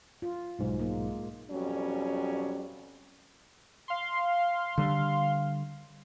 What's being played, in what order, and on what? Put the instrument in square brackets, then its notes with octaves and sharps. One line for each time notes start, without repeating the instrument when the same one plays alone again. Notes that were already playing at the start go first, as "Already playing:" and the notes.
[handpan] F4
[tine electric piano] B1 G#2
[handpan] G#3 A#3
[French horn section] F2 B2 F#3 G3 C#4
[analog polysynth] F5 C6
[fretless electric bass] D3 G3